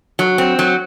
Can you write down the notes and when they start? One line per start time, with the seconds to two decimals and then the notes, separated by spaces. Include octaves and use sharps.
0.19 F#3
0.38 C4
0.59 F#3